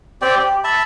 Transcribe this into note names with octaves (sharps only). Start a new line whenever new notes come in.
C4 G4 D5 G5
G4
E5 A5 B5